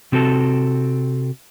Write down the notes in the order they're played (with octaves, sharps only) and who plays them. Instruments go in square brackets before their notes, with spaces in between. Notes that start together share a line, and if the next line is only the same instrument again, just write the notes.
[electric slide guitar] C3 C4 F#4 A4 A5